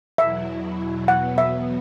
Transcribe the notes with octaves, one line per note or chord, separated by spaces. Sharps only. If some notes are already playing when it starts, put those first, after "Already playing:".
E2 B2 F#3 E4 E5
E2 B2 F#3 B3 F#5
E5